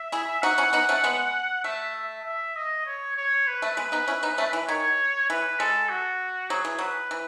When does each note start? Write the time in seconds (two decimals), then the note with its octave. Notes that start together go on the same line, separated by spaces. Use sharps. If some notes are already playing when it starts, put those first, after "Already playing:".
Already playing: E5
0.12 E4 G#4
0.43 D#4 F#4 F#5
0.58 C#4 E4
0.73 B3 D#4
0.89 A3 C#4
1.04 G#3 B3
1.64 A3 E5
1.95 E5
2.26 E5
2.56 D#5
2.86 C#5
3.17 C#5
3.47 B4
3.62 A3
3.77 G#3 B3 B4
3.92 B3 D#4
4.08 C#4 E4
4.23 B3 D#4
4.38 A3 C#4
4.53 E3
4.68 D#3 C#5
5.30 E3 B4
5.60 G#3 A4
5.89 F#4
6.50 F#3 G#4
6.65 E3
6.79 F#3 B4
7.11 E3